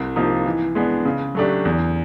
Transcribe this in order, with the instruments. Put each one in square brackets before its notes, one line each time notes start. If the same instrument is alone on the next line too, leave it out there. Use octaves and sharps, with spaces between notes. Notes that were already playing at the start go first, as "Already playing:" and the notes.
Already playing: [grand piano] C2
C3 F3 A#3 D#4
E3
G#3 B3 D4
C#3
F#3 A3 D4 G4
E2